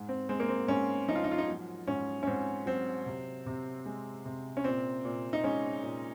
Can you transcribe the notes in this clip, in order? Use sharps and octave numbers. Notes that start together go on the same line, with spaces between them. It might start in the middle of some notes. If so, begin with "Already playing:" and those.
Already playing: G#2
C4
G#3 C4
A#3
C4
G#2 C#4
F3 D#4
F4
D#4
F4
D#4
F#3
G#2 C#4
C#4
G#2 C4
F#3 C4
C3
C3
G#3
C3
C#4
A#2 C4
A#2
D#4
G#3 C#4
A#2